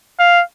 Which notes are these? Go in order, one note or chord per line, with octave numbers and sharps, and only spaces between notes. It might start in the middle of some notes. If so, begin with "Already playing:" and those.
F5